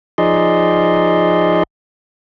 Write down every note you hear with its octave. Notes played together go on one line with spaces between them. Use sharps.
F3 D#4 G#4 D5 D#5 C6